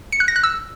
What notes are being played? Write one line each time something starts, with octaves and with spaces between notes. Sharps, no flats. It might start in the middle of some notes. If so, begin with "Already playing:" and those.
C#7
F#6
A#6
F#6
E6